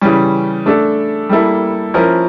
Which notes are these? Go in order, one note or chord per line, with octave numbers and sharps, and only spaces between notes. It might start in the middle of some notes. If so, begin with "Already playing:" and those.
C#3 E3 G3 C#4
A3 D4 A4
G3 A#3 E4 A4
F3 C#4 E4 A#4